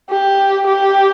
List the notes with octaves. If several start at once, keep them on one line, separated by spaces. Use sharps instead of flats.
G4
G4